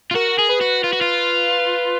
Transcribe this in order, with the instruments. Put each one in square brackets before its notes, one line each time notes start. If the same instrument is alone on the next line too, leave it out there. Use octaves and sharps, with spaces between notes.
[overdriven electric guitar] F4
[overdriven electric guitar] F#4 [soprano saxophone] A#4
[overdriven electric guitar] G#4
[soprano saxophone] B4
[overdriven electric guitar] F#4
[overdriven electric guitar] F4 [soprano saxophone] B4
[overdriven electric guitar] F#4
F4